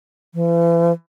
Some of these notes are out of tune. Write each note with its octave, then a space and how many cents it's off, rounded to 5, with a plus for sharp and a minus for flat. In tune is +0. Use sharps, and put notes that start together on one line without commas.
E3 +40